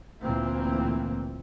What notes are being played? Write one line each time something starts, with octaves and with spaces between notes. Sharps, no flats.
D2 A#2 E3 A#3 C4